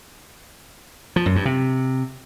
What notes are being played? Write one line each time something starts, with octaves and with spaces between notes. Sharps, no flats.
F3
F#2
G2
C3